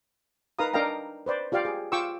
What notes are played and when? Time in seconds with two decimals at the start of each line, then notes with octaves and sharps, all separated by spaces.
0.59 D#4 A#4 B4 F5 A#5 D#6
0.74 D4 A#4 D#5 F5 G5 A#5
1.26 B4 C5 D5
1.52 F4 G4 D5 F5 G5
1.65 G#4
1.92 F4 G5 C#6 D6 E6